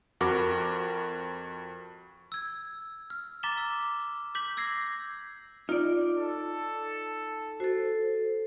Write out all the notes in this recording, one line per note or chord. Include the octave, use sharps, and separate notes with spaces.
F2 F#4 A#4 D6
E6 G#6
F6
A#5 D6 A6 B6 E7 G7
E6
D6 G6 B6 F#7
E6 G#6 A#6 C7
D#4 F4 D5
A4
F#4 A4 C5